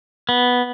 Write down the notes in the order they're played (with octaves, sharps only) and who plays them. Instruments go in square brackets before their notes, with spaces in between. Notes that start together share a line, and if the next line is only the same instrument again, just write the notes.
[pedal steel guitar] B3